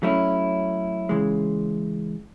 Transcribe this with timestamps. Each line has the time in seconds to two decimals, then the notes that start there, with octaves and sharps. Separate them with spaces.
0.03 F#3 A3 C#4 E4
1.09 C#3 E3 G#3